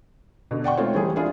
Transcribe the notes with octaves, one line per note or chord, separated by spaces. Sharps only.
B2 D3
D5 F#5 G5 C#6
G#3 A3 C4 D#4 F4 C#5
E3 G3 G#4
D4 E4 F4 G#4